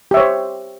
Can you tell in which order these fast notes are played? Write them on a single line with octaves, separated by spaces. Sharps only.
G4 E5 C#5 C5